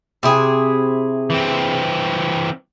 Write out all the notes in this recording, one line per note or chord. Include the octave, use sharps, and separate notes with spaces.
C3 E4 G#4
E3 C4